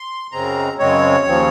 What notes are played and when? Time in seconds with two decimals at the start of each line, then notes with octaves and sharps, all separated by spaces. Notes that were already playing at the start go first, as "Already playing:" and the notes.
Already playing: C6
0.32 F#2 C#3 G#3 C4 A#5
0.79 F#2 C#3 G#3 C4 C#5
1.25 D#2 C#3 F3 C4